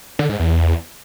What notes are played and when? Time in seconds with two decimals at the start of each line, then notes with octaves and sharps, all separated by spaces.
0.19 D3
0.29 G#2
0.40 E2